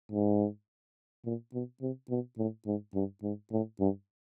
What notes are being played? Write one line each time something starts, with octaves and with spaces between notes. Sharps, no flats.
G#2
A#2
B2
C3
B2
A2
G#2
G2
G#2
A2
G2